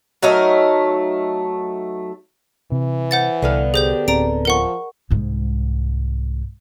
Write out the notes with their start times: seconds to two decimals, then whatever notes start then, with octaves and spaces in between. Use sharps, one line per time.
0.23 F#3 A3 D#4 A#4
2.72 C3 E3
3.11 C5 F#5 A6
3.42 C2 D3 B3 F5
3.74 G4 G#4 C5 G6
4.08 D1 C4 D5 A#5 D7
4.45 F3 A#4 F#5 C#6
5.11 C2 G#2